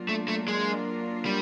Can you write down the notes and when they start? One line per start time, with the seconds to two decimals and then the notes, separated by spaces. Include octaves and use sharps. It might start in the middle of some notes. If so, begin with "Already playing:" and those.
Already playing: F#3 A#3 D4 F4 A#4
0.09 A3
0.28 A3
0.48 G#3
1.26 G3